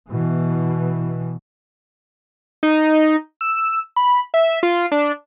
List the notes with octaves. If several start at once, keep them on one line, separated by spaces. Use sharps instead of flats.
B2 E3
D#4
E6
B5
E5
F4
D4